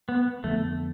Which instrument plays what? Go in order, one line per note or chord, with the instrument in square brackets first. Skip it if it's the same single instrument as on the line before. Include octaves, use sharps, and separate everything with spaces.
[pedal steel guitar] B3
[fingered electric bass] F2 D3 F3 B3 [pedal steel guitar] A3